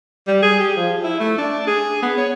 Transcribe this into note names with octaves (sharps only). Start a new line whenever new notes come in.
G3
G#4
G4
F3
E4
A3
D4
G#4
B3
C#5